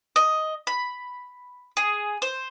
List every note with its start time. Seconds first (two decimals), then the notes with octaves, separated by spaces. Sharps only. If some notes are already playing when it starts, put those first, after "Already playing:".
0.16 D#5
0.67 B5
1.77 G#4
2.22 C5